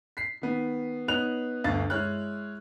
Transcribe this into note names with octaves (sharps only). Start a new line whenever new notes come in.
B6 C7
D#3 B3
B3 D#4 C#5 F#6 F7
G1 D2 F5 A6
G#3 E4 C#5 F6 F#6